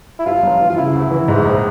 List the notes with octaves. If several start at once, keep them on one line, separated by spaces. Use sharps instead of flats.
E4
G2 F4
G1
E3
F4
C#3 E4
D2
E3
G#2
A#1